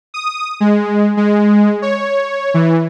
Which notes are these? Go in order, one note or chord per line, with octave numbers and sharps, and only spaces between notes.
D#6
G#3
G#3
C#5
E3